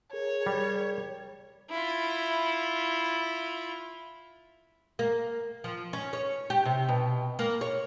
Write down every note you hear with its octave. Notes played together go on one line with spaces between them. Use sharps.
G#4 A#4 C#5
G3
E4 F4
A#3
F3
C#4
C#5
G4
C3
B2
A#3
C#5